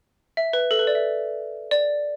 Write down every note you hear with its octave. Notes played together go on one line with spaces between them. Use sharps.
E5
B4
A4
B4
D5
E5
D5